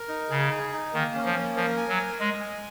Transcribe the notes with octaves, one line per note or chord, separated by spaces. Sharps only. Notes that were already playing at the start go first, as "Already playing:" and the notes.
Already playing: A#4
D#4
C#3 G#4
G#4
D#4
D#3 A#3
C#4
F3
A#3
F3 A#4
G#5
F#3
A#4
G#3 D#5
G#5